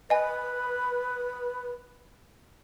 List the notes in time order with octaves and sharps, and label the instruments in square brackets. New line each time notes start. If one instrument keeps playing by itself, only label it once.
[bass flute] B4 [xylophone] D#5 G#5